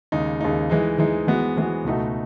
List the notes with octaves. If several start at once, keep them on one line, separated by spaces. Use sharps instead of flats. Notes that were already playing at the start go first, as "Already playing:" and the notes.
D#2 C#3 G#3 D#4
D#2 C#3 G#3 D#4
E3 G#3 D#4
E3 G#3 D#4
E3 G#3 B3 F#4
E3 G#3 B3 F#4
C#2 B2 A3 D#4 F#4